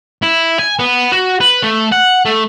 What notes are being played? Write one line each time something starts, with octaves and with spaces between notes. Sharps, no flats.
E4
G#5
B3
F#4
B4
A3
F#5
A3